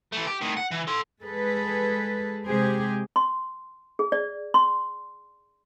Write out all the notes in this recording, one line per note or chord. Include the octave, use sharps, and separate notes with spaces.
E3 A3
G4
A2 D#3
F#5
E3
A4 C6
G#3 G#4 A4 B4
C3 G#3 G4 G#4 C5
C6
G#4
D5
C6